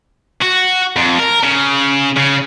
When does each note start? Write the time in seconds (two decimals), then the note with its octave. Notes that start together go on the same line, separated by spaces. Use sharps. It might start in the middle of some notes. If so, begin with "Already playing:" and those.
0.42 F#4
0.96 F2
1.19 A#4
1.43 C#3
2.17 C#3